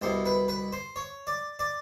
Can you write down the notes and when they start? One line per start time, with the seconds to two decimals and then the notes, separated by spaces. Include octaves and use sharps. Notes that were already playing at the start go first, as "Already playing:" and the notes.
0.02 C2 B2 C5
0.26 B4
0.48 B4
0.73 C5
0.96 C#5
1.27 D5
1.59 D5